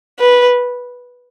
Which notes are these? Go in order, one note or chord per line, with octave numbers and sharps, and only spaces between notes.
B4